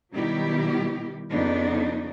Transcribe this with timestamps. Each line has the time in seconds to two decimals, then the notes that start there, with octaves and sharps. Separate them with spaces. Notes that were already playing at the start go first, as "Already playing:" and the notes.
0.12 B2 D#3 F#3 G3 E4 G4
1.30 F2 C#3 B3 D4 D#4